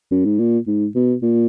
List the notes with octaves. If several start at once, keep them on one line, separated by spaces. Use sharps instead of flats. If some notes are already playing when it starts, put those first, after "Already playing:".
F#2
G#2
A#2
G#2
B2
A#2